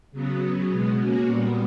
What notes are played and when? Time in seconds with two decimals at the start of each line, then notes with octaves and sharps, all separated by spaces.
0.12 C#3 F#3 B3
0.40 C#3 F#3 B3
0.69 B2 G#3 B3
0.97 A#3 C#4 F#4
1.25 A#2 G3 B3